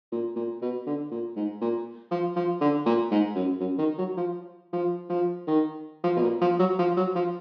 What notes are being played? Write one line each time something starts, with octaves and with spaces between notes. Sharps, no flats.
A#2
A#2
B2
D3
A#2
G#2
A#2
F3
F3
D3
A#2
G#2
F#2
F#2
D#3
F#3
F3
F3
F3
D#3
F3
B2
A#2
F3
F#3
F3
F#3
F3